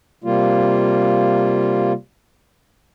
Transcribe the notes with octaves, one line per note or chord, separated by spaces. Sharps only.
C3 G3 A#3 F4